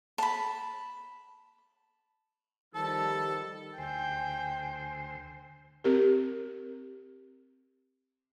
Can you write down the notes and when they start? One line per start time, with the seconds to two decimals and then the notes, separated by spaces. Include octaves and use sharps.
0.18 A5 B5
2.75 D#3 F3 G3 A4 A5
3.78 D2 C5 G5 G#5
5.84 C4 G4 A#4